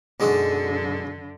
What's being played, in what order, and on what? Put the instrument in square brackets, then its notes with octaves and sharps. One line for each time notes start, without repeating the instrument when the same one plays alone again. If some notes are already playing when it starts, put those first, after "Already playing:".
[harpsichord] B1 G#3 F#4 [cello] F#2 D3